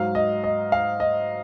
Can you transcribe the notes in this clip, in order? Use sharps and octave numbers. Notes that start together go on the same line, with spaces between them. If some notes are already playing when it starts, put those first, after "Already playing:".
Already playing: G#2 F#3 F5
D#5
D#5
F5
D#5